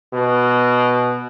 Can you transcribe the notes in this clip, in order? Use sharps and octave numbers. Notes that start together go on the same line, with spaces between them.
B2